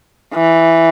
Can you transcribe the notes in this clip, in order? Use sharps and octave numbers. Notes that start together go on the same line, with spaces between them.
E3